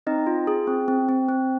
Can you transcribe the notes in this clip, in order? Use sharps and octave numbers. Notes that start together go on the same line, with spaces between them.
C4 D#4 D#5
F4
G#4
C4
C4
C4
C4